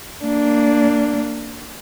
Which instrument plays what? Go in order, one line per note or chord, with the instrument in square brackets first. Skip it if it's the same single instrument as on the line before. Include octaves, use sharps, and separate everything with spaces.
[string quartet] A#3 D4